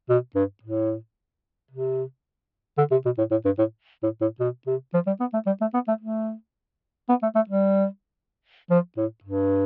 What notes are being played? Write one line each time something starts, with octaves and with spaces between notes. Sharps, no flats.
B2
G2
A2
C3
D3
C3
B2
A2
A2
G2
A2
A2
A2
B2
C3
F3
G3
B3
A3
G3
A3
B3
A3
A3
B3
A3
A3
G3
F3
A2
G2